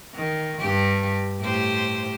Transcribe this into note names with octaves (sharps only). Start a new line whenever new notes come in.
D#3
G2 G4
A2 G4 C5